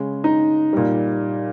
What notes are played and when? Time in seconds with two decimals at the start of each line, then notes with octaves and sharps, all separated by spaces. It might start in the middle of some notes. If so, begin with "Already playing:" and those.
Already playing: C#3 G#3
0.24 D#4
0.73 A#2 G3